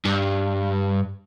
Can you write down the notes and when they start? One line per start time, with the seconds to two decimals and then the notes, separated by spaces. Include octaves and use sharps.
0.05 G2